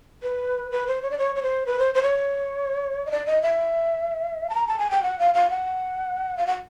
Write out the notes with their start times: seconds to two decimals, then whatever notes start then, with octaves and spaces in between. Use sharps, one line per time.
0.23 B4
0.71 B4
0.87 C5
1.02 C#5
1.11 D5
1.18 C#5
1.36 C#5
1.43 C5
1.66 B4
1.79 C5
1.94 C5
2.03 C#5
3.06 D#5
3.11 D5
3.26 D#5
3.42 E5
4.50 A5
4.55 A#5
4.67 A5
4.79 G#5
4.91 G5
5.03 F#5
5.19 F5
5.34 F5
5.50 F#5
6.37 F5
6.47 F#5